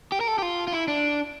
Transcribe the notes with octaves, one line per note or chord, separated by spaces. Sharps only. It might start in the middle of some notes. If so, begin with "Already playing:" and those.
G4
A#4
A4
G4
F4
F4
E4
D4